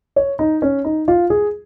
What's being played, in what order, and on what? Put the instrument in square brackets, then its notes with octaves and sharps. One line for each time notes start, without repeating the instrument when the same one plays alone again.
[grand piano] C#5
D#4
C#4
D#4
F4
G#4